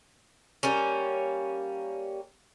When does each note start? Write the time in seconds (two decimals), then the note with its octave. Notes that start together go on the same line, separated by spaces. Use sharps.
0.63 G3 A#3 C#4